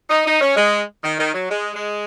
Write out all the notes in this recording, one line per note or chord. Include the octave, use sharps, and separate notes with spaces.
D#4
D#4
C#4
G#3
D#3
D#3
F#3
G#3
G#3